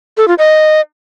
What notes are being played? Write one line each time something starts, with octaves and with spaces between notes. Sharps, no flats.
A4
F4
D#5